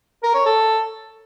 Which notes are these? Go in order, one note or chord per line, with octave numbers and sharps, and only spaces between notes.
A#4
C#5
A4